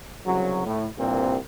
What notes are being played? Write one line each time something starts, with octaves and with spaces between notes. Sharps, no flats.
C2 C#3 F#3
A2
C2 G2 A#2 C4